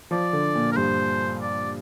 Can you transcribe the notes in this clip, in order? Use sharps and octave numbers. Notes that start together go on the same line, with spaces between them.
F3 D5
D3
A#2
A#4
G2 C5
D5